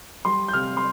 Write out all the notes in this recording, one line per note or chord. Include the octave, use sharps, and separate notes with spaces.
G3 C6
G6
C3 F6
C6